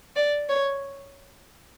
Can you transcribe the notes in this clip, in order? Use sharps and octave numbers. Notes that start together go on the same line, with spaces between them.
D5
C#5